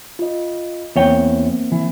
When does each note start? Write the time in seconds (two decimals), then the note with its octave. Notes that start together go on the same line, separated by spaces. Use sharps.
0.19 F4 D#5
0.96 E2 A#3 C4 C#5 G5
1.72 E3